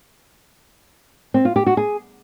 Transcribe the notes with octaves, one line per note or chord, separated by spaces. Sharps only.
C4
F4
G4
F#4
G#4